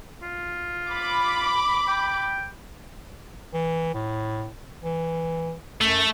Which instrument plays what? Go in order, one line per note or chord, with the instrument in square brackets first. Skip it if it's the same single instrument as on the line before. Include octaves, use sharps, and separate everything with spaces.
[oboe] F4
[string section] B5 D6
[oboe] G5
[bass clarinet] E3
A2
E3
[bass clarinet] F#2 [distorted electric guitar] A3